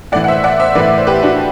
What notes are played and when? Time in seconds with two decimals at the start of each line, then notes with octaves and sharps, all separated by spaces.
0.12 A2 D5 F#5
0.16 E3
0.24 F#5
0.28 C5 E5
0.44 D5 F#5
0.60 C5 E5
0.75 A2 E3 B4 D5
0.98 C5
1.07 G4 B4
1.23 D4 F#4